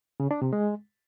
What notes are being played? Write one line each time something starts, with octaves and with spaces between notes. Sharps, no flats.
C#3
D4
C3
G#3